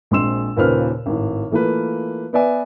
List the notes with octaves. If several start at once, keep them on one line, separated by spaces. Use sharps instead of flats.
A#1 G#3 C4 C6 E6 E7
D#2 A#2 C#3 B4 C5 F6
G#1 A2
E3 A3 A#3 F4 B4
B3 B4 D5 E5 G#5